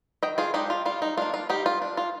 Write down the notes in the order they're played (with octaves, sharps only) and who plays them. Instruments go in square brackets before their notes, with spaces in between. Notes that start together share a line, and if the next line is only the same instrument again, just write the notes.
[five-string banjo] D#3 D#5 G5
F4 G#4
G#3 D4 D#4 G4
F4
G3 F4
D#4
A#3 D4 F4
F4
G3 D#4 G4
F4
D4
F4